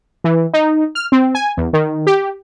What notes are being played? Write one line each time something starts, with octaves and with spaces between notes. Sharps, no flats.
E3
D#4
F6
C4
G#5
E2
D#3
G4